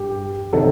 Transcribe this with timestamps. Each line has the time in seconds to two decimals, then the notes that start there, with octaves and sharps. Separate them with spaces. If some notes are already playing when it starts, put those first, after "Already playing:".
Already playing: G2 G4
0.53 C3 D#3 F#3 A4